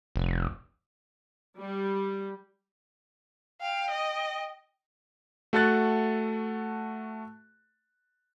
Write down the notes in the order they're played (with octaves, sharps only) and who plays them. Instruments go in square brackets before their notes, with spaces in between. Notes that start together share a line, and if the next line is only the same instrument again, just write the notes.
[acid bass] F1
[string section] G3
[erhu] F5 [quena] G5
[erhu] D#5
[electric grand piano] A3 F#4 A4 F#5 F#6 A6